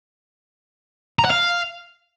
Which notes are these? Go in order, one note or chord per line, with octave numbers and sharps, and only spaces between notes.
A#5
F#5
F5